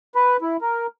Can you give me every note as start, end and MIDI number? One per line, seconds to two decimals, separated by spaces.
0.15 0.37 71
0.42 0.57 64
0.61 0.87 70